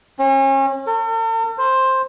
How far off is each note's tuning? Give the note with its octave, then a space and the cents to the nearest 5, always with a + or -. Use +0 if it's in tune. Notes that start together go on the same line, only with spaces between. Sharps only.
C#4 -35
A4 +45
C5 +10